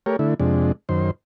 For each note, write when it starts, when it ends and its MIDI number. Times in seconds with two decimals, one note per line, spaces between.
0.06 0.16 57
0.06 0.16 67
0.06 0.16 70
0.06 0.16 73
0.19 0.34 50
0.19 0.34 57
0.19 0.34 64
0.40 0.72 41
0.40 0.72 48
0.40 0.72 56
0.40 0.72 62
0.89 1.11 42
0.89 1.11 51
0.89 1.11 72